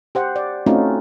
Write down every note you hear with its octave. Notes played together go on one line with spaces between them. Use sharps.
G4 C5 F#5
D5
A3 C4 C#4 D#4 F4 F#4